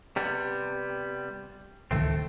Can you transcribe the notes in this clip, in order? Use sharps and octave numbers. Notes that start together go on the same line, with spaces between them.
C3 G3 B3
D1 C#2 D#3 A3 C4